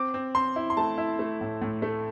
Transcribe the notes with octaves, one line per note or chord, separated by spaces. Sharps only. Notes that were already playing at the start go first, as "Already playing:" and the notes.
Already playing: C4 D6
C4
C4 C6
E4
C6
A3 A5
E4
A3
A2
A2
A3